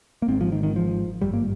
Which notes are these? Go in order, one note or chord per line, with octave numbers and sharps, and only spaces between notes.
A#3
G#1 G#2 C4
F3
D#3
D#3
F3
G#1 G2 G3
A#3